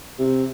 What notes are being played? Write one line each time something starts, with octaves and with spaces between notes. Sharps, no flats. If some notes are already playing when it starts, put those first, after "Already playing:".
C3